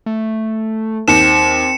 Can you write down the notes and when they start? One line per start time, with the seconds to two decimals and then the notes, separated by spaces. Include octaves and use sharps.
0.06 A3
1.08 D#2 C4 C#7 E7